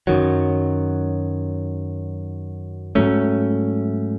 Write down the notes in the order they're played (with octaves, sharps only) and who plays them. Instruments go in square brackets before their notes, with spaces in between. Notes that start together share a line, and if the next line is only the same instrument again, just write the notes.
[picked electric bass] F#2 D#3 F#3
G#2 F#3 A3 C#4